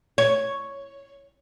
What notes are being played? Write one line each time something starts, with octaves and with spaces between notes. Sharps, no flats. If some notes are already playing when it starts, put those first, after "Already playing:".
C#5